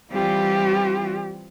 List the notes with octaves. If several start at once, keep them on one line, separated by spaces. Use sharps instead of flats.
E3 G3 C4 F4 G4